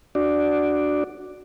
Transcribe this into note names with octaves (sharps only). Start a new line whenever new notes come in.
D4 F#4 D5